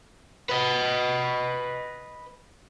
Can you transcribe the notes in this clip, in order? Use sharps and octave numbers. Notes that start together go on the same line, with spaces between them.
B4 D#5